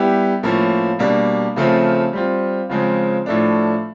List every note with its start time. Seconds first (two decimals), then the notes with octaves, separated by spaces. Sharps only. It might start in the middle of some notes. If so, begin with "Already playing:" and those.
Already playing: G3 B3 E4 G4
0.43 A2 F3 A#3 C#4
0.99 B2 G3 A#3 D4
1.56 C#3 F3 A3 C4 F4
2.13 G3 C4 F4
2.70 C#3 F3 G#3 C4
3.26 A2 F3 A3 D4